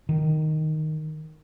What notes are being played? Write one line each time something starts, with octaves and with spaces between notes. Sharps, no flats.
D#3